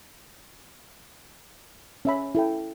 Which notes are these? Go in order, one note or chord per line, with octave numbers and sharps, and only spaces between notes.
C#4 E5 B5
E4 A4 G5